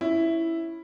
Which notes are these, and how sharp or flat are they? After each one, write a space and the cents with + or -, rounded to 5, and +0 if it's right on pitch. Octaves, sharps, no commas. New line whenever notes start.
C#4 +0 E4 +0